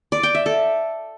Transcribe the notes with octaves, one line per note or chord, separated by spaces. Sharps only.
D5
G5
E5
A4